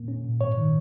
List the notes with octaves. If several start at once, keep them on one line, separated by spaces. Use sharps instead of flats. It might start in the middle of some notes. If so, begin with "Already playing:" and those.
Already playing: A#2 A#3
C#4
A#2
G#2 C#5
D#3